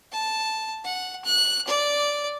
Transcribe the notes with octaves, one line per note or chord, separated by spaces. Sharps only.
A5
F#5
F#6
D5